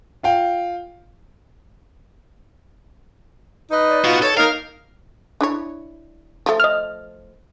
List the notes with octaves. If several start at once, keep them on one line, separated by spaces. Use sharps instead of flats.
F4 F5 G5
D#4 B4 D#5
D5
B3 F4 F#4
A4 C#5
D#4 A#4 F5
D4 E4 C#5
F3 A3
D#5 F6